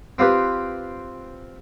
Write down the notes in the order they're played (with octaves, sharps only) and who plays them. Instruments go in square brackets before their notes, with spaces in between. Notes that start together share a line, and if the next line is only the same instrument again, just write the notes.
[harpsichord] C4 F4 G4 B4